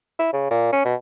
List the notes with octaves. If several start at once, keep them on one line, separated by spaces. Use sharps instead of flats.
E4
C#3
A#2
C#4
B2